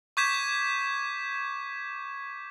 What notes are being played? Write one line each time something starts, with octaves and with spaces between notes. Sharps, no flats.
C#6 D6 G6 G#6 B6 E7